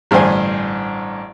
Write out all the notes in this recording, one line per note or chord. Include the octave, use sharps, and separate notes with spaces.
A1 G2 D3 C5 G#5